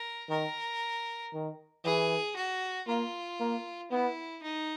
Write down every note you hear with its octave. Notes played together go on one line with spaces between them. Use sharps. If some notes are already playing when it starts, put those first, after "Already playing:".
Already playing: A#4
D#3 A#4
D#3
E3 G#4
F#4
A#3 F4
A#3
B3 E4
D#4